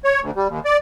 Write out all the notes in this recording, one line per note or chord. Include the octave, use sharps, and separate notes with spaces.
C#5
D2
G3
D#2
D5